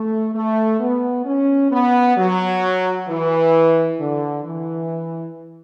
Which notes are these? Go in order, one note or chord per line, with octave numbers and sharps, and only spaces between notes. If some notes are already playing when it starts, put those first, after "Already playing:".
Already playing: A3
A3
B3
C#4
B3
F#3
E3
D3
E3